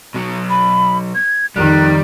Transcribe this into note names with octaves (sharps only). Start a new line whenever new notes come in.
B2 F#3
B5
G#6
F2 D#3 G3 F#6